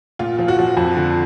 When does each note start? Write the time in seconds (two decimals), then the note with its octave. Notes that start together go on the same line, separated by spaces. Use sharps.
0.19 A#2 F4
0.39 F3
0.48 F#4
0.59 F3
0.77 F2
0.96 D3